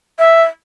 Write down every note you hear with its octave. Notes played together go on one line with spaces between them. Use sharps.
E5